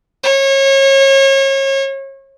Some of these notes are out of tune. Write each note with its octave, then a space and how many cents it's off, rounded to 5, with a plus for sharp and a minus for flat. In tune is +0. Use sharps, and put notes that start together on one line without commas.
C#5 -30